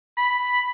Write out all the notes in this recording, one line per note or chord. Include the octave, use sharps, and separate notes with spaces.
B5